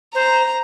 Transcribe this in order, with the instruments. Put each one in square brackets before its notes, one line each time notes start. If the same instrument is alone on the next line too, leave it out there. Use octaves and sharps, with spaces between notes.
[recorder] C5 [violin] A#5